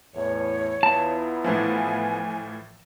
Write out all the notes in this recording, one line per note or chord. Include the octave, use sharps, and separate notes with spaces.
E2 A2 C#5
E2 B3 E4 F4 A5
A2 E3 F3 G#5